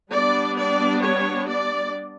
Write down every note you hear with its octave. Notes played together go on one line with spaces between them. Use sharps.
G3 B3 D4 D5
D5
C#5
D5